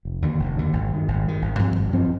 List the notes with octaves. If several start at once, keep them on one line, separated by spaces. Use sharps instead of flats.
F1
D#2 D3
F1
D#2 D3
G#1
G2 D#3
G#1
G2 D#3
G#1
G2 F3 C4
G#1
G2 F3 C4